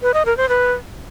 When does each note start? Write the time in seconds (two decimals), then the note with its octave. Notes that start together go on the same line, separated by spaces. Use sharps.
0.02 B4
0.14 D#5
0.26 A#4
0.37 C5
0.49 B4